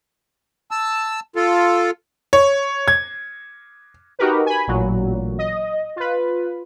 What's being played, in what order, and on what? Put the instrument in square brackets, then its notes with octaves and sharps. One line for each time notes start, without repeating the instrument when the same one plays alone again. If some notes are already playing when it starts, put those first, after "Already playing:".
[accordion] A5 E6
F4 A4
[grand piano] C#5
G#6
[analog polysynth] D#4 F#4 G4 A#4 B4
G#5 B5
A1 A#2 F#3
D#5
F4 B4